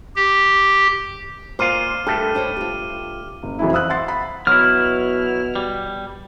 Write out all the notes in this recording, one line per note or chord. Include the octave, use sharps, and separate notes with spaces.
G4
A#2 F4 C5 D6 F6 D#7
G2 A3 A4 A#4
D4 C5 C#5
F4 G4
F#1
F2 E3 F#3 E4
C5 F5 D#6 E6 F#6
E5 F#5 C6 A6 C7
B5
B2 F#3 E4 F6
G3